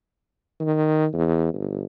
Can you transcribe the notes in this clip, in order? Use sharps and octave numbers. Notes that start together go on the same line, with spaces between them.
D#3
E2
G1